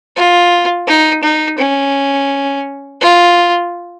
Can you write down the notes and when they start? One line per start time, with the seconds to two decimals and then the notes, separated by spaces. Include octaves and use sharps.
0.16 F4
0.87 D#4
1.23 D#4
1.59 C#4
3.01 F4